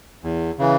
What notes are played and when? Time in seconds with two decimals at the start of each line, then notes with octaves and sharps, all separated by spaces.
0.24 E2
0.59 C#3 E3